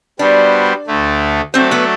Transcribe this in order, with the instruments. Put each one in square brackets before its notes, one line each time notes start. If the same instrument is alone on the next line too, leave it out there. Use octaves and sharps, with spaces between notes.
[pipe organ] G3 B3 F#4 C5 [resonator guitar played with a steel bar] D4 D5
[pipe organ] D2 D3 A3
[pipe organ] F#3 A3 D4 A4 [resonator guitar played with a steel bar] C4 C5
[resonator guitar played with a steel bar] B3 B4